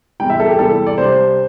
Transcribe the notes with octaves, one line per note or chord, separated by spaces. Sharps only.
E2 C3 G3 E4 G5
E5
A4
G4
E2 C3 G3 E4 A4
D5
C2 C3 G3 D4 C5